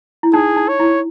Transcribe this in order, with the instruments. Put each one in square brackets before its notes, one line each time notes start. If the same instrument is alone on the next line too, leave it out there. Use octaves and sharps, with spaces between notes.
[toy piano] E4
[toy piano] D#4 [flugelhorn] G#4
[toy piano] D#4
[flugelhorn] C#5
[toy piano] E4